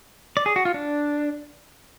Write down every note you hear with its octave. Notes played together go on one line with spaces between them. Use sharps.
D5
G#4
F#4
F4
D4